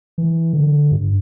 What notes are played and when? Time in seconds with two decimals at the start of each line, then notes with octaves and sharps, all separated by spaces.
0.18 E3
0.53 D3
0.91 G2